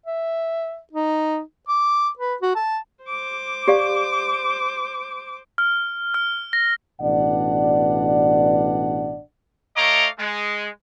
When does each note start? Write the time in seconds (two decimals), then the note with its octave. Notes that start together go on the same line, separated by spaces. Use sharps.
0.06 E5
0.93 D#4
1.68 D6
2.19 B4
2.42 F#4
2.56 A5
3.04 C5 D6
3.68 G4 D5 F5
5.58 F6
6.14 F6
6.53 A#6
7.01 A1 B2 D4 D5 F#5
9.76 A3 C#5 D#5 F5 A#5 D6
10.19 G#3